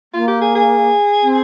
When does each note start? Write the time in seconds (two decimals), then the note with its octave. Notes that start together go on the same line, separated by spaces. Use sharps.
0.13 A#3 F4
0.27 G4
0.41 G#4
0.55 G#4
1.23 C4